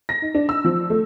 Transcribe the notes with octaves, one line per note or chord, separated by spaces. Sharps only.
A#6
D#4
D4
E6
F3
A3